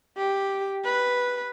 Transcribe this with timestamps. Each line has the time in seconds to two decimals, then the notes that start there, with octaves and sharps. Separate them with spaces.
0.18 G4
0.85 B4